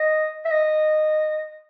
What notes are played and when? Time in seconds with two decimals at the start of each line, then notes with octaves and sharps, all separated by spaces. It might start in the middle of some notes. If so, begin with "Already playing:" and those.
Already playing: D#5
0.45 E5
0.51 D#5